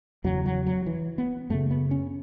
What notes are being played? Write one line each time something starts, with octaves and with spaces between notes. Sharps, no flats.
E2 C#3 F#3
F#3
F#3
E3
B3
F#2 C#3 A3
B3
C#4